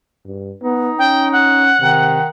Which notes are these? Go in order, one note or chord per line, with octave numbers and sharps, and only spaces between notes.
G2
B3 D#4
C#4 G5
F#5
C3 D#3